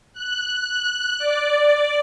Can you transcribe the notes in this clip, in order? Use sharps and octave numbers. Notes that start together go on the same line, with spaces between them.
F#6
D5